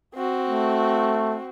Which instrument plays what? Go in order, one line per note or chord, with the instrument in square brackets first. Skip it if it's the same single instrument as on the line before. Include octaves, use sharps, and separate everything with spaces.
[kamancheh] C4 F#4
[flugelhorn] A3